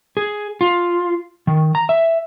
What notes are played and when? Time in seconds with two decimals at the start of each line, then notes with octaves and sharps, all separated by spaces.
0.17 G#4
0.61 F4
1.47 D#3
1.75 A#5
1.89 E5